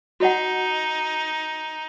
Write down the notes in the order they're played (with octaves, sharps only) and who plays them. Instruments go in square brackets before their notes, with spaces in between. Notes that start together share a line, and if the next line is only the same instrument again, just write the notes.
[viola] D#4 [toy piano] F#4 D#5 F#5